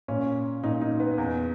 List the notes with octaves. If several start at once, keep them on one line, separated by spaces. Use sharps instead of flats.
A#2 C#4
A#2 D#4
D#4
B3
E2